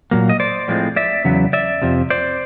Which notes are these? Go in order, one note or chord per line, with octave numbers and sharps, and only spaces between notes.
A#2 F#3 A#3
D#5
C5 D5
A2 F3 G#3 C4
D5 E5
E2 C#3 F#3 B3
D5 E5
F2 C3 F3
C5 D5